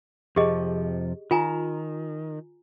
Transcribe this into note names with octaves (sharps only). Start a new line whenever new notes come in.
F2 C3 F3 G4 G#4 D#5
D#3 F4 G#5 A#5